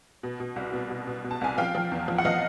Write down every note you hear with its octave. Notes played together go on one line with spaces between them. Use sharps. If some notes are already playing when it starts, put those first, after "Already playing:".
B2
B2
C2
B2
B2
B2
B2
A5
C2 G#5
F3 F5 G5
F3
E2
F3
F#5
F3 D#5 F5